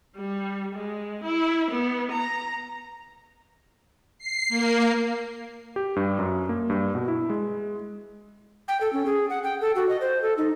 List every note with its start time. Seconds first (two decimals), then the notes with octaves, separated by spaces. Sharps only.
0.16 G3
0.75 G#3
1.24 E4
1.71 B3
2.12 A#5
4.19 C7
4.49 A#3
5.76 G4
5.96 G2
6.19 F#2
6.49 A#3
6.70 G2
6.95 B2
7.08 E4
7.30 G#3
8.68 G5
8.81 A4
8.93 C#4
9.06 G#4
9.30 F#5
9.44 G5
9.61 A4
9.76 F#4
9.89 D#5
10.01 C5
10.22 A4
10.38 D#4